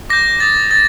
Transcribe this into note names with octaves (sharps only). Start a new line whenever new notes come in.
D6 G6 A#6
D#6 G6 A6
D#6 G6 A6